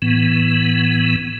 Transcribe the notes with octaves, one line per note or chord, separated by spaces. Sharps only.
A2 E3 B3